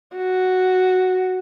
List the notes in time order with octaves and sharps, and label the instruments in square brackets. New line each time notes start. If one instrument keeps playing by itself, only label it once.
[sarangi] F#4